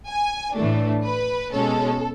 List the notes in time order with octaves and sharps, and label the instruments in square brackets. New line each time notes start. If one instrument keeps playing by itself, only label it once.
[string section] G#5
A2 E3 A3 D4
B4
B2 G#3 C#4 A4